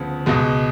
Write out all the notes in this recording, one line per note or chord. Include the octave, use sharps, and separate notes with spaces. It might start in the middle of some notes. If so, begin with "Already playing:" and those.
Already playing: D2 C#3 F3 B3
C#2 B2 G#3